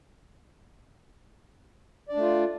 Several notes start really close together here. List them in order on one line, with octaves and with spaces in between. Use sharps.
D5 D4 A3 F4